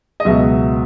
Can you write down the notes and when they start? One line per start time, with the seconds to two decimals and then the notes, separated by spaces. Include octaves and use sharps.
0.20 D#5
0.25 C#2 B2 F#3 E5